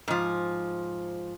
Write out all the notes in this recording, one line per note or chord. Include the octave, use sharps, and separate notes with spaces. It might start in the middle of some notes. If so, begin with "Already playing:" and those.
G#2 F3